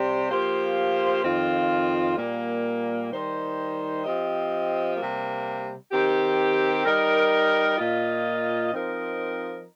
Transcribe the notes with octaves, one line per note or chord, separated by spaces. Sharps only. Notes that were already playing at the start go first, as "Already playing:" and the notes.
Already playing: C3 G3 C4 G4 C5
F3 A#3 G4 C5
F2 D#3 C4 F4
A#2 G3 A#3
D#3 G3 D#4 C5 D#5
F3 C4 G4 D#5
C3 G3 A#3
D#3 C4 G4
G3 D#4 A#4
A#2 A#3 F4 D#5
F3 C4 D#4 A#4 D#5